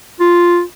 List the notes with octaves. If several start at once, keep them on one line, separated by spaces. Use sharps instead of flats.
F4